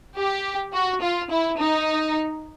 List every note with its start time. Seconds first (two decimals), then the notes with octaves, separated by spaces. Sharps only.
0.17 G4
0.73 F#4
1.02 F4
1.30 E4
1.58 D#4